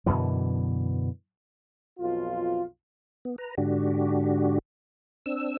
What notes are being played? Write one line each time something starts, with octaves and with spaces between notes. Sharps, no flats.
F#2 B2 D3 E3
B1 F2 F4
B3
B4 A#5
G#2 D3 D4 F#4 G4
C4 D4 E6